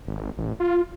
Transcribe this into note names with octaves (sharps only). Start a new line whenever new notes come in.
G#1
A1
F4